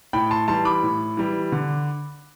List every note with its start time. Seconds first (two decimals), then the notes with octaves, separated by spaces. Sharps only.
0.13 A2 G5 B5
0.31 A5 C6
0.48 E3 G3 A5 C6
0.65 B5 D6
0.83 A2
1.17 E3 G3
1.52 D3